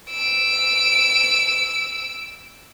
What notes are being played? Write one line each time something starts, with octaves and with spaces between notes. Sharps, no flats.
E6 D7